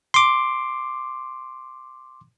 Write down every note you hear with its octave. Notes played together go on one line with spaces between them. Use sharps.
C6 D6